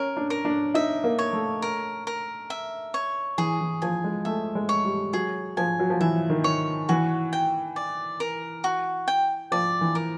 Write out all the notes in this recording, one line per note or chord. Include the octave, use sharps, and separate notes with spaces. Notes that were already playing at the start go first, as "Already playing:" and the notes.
Already playing: C#4 A#4
D4
A#4
D4
D#4 E5
A#3
C#5
A3
A#4
A#4
E5
C#5
E3 G#4
E3
F3 G#5
G#3
A3 E5
G#3
C#5
G3
F#3 G#4
F3 G#5
F#3
F3
E3 E5
D#3
C#5
E3 F#4
G5
D5
A#4
F#4
G5
F3 D5
E3
A#4